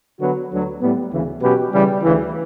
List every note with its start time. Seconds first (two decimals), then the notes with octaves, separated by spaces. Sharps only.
0.19 D3 F#3 B3 F#4 B4
0.51 D2 D3 F#3
0.81 A2 G3 B3
1.11 D2 C#3 E3
1.42 B2 F#3 C#4 G4 B4
1.73 C#3 E3 G3
2.03 D2 C#3 E3